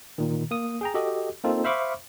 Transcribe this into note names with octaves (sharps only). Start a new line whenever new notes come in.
A#2 D#3
A#3 D#6
G#4 G5 A#5
F#4 G4 A4 D#5
A#3 C4 D#4 F4 A4
C5 E5 F5 B5 C#6 D6